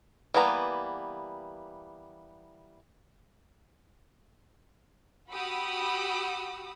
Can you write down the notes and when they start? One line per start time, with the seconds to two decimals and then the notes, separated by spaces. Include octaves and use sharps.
0.34 E3 G3 A#3 B3 A#5
5.32 F#4 G4 B5 D#6 E6